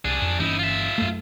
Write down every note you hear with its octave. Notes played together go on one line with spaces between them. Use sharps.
C2 D4 G#4
F2
G1 E3 C#4 D#4 E4
F4 E5
F#2 A3